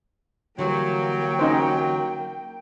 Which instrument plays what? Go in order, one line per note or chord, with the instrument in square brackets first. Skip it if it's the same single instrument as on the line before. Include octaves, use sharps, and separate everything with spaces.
[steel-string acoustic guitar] D3 E3 G3 [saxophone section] F#3 [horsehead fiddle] A#3 G5
[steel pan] C#4 D#4 C5